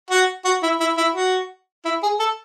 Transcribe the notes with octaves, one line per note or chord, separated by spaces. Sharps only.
F#4
F#4
E4
E4
E4
F#4
E4
G#4
A4